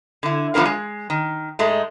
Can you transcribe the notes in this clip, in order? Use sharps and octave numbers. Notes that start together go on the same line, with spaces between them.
D3 E4
E3 F3 B3 D4 A#4 F5
G#3
D#3
G#2 G#3 A3